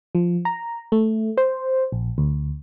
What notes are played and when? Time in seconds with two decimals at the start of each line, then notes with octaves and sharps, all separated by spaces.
0.15 F3
0.45 A#5
0.92 A3
1.37 C5
1.92 A#1
2.18 D2